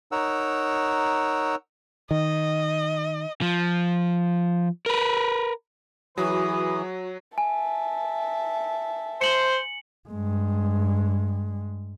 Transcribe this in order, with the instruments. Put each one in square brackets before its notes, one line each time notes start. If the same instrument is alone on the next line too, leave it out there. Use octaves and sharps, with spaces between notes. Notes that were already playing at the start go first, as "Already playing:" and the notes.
[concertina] D#4 A#4 C#5 F#5 E6
[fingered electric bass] D#3 [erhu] D#5
[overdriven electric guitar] F3
A#4 B4
[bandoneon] E3 [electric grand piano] F#3 [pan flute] F#4 [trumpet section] G#4 B4 D#6
[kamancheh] E5 A5 [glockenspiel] G#5
[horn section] C5 [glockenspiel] C#7 F#7
[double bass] G2 G#3